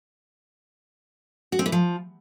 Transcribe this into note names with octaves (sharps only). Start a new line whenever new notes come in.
F#4
C4
E3
F3